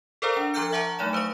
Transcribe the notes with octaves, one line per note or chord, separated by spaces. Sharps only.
A4 A#4 C5 D5 F5 A#5
D4 F7
F3 A#5 D6 F6 G6 C#7
E5 F#5 A5 A#5 C#6
F#3 A3 D#4 D5 E7
B4 C5 F5 C#6